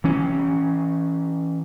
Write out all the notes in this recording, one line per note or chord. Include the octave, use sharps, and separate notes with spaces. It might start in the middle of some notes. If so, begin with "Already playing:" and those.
E3 C#4